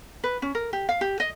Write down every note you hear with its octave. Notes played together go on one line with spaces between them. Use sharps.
B4
C#4
A#4
G4
F5
G4
D#5